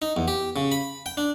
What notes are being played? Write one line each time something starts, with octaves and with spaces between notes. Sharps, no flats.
D#4
E2
G4
C#3
B5
G5
D4